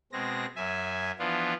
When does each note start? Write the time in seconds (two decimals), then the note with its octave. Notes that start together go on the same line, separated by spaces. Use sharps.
0.12 B2 G#3 C4 A#6
0.56 F#2 E5 G#5
1.19 E3 F3 B3 D4 F4